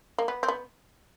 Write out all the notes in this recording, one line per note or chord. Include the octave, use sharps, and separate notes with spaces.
A#3
B3
C4
B3